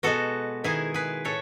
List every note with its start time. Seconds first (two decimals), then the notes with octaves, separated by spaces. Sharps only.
0.03 B2 G#3 B3 F#4 A4
0.64 D#3 G#3 B3 E4 G#4
0.94 G#4 B4
1.25 A2 A4 C#5